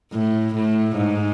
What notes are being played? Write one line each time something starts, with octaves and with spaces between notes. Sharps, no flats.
A2
A2
G#2